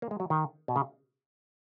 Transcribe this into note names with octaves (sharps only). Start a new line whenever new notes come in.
A#3
G#3
F#3
D#3
B2
C#3